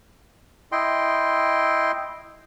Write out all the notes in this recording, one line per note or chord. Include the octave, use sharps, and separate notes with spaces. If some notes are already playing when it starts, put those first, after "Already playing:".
E4 D#5 G5 C6